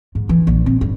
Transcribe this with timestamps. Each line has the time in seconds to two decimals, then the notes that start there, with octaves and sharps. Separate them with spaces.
0.15 G#2
0.29 E3
0.47 A#1
0.66 C4
0.81 G2